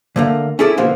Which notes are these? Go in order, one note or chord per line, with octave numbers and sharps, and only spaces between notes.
D3 A3 A#3
C#4 E4 G#4 A4 D5
B2 D3 F3 A#3